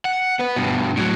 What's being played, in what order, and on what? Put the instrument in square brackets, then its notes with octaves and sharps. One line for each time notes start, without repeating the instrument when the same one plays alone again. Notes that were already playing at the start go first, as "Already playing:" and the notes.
[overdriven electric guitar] F#5
B3 B4
G2 B2
A2 F#3